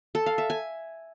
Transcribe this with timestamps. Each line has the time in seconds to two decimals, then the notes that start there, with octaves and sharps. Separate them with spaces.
0.15 A4
0.26 F5
0.38 E5
0.50 G#5